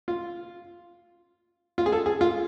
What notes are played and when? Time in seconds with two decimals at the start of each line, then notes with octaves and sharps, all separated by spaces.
0.08 F4
1.78 F4
1.86 G#4
1.92 A4
2.06 G#4
2.21 F4